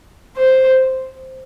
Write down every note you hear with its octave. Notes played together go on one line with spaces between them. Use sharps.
C5